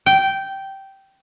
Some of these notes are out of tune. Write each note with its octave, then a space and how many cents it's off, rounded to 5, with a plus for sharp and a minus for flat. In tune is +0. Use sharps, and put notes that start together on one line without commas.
G5 -10